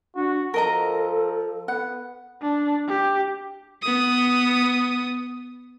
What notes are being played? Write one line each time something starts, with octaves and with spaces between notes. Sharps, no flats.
D4 F#4
F3 A4 A#4 D#5 A#5
B3 F#5
D4
G4
B3 D#6